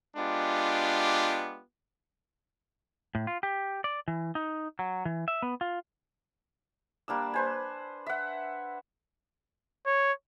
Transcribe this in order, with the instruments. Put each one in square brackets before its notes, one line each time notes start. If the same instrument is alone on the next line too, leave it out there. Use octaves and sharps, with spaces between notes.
[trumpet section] G#3 B3 D4 F4 G4
[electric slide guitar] A2
F4
G4
D5
E3
D#4
F#3
E3
E5
B3
F4
[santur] G3 A#3 D4 E6
B4 C5 G#5
E5 F#5
[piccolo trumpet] C#5